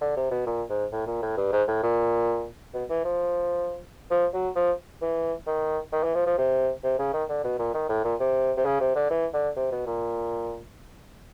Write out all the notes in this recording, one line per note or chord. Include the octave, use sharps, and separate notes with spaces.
D3
C3
B2
A#2
G#2
A2
A#2
A2
G2
G#2
A2
A#2
B2
E3
F3
F3
F#3
F3
E3
D#3
D#3
E3
F3
F3
C3
C3
C#3
D#3
D3
B2
A#2
D#3
A2
A#2
C3
C3
C#3
C3
D3
E3
D3
C3
B2
A#2